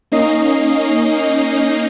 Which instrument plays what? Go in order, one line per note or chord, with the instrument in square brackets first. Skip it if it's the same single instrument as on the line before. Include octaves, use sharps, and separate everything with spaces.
[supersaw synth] A#3 C#4 D#4 D#5 C7